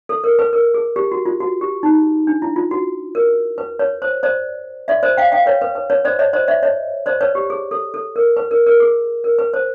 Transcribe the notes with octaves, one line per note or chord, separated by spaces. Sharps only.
A4
A#4
B4
A#4
G#4
G4
F#4
F4
F#4
G4
D#4
D4
E4
F4
F#4
A#4
B4
B4 C#5
C5
C5 D5
D5 E5
C5 D5
F5 G5
F5 G5
B4 C#5
B4
B4
B4 C#5
C5 D5
C#5 D#5
C5 D5
D5 E5
C#5 D#5
C5 D5
B4 C#5
G4
G#4
A4
A4
A#4
B4
A#4
A#4
G#4
A#4
B4
C5